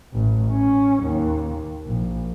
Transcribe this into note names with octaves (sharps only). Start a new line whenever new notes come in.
A1
C#4
D#2
A#1